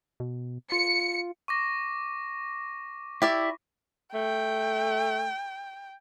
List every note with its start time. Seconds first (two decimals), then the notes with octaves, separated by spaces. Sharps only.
0.20 B2
0.72 F4 C#7
1.48 C#6 D6 A#6
3.22 E4 G4 D5 E5
4.14 A3 G5